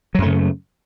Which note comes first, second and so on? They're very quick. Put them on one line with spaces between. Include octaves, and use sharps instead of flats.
F#3 F#2 A3 C#3